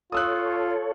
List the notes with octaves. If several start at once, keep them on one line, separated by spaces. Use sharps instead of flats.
F4 A4 C#5 D#6 E6 F#6